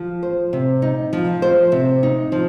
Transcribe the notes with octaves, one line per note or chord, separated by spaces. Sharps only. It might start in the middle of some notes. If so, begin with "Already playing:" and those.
Already playing: F3
C5
C3
D#4
F3
C5
C3
D#4
F3